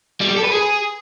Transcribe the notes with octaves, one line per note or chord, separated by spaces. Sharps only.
G3
G4
A4
B4
G#4